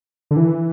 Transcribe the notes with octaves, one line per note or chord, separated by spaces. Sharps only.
D3
E3